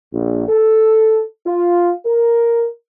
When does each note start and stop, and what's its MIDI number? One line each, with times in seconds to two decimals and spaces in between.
0.13 0.46 34
0.48 1.23 69
1.47 1.92 65
2.06 2.67 70